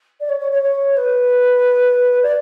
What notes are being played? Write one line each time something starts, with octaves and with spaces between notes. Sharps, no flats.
D5
C#5
C#5
C#5
C#5
B4
D5